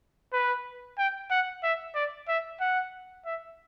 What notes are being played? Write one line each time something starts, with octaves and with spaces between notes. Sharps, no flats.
B4
G5
F#5
E5
D5
E5
F#5
E5